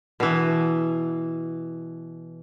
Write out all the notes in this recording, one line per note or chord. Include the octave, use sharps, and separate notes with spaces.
B2 E3